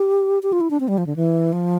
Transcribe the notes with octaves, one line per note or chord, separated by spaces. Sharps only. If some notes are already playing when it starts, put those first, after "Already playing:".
Already playing: G4
G4
F4
E4
D4
C4
G3
F3
D3
E3
F3